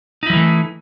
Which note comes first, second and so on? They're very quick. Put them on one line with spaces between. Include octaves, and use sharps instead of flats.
D#4 E4 F3 E3 A3